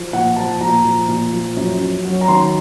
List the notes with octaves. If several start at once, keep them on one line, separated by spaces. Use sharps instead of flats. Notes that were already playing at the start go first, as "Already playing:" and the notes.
Already playing: F3
A#2 F#5
F3 A5
A#2 A#5
F3
A#2
F3
F#2
F#2
F#3
A#5
D#3 C6